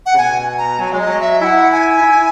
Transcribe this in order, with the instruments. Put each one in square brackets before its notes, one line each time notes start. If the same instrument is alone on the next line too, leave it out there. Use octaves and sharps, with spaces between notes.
[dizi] F#5
[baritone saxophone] C#3
[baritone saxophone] B2 [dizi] G#5
[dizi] A#5
[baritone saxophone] F#3 [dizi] G#5
[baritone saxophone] G#3 [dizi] C#5
[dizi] D#5
[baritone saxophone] F#3
[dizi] E5
[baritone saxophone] E4 [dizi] F#5 G#5
[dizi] G#5
[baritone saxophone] E4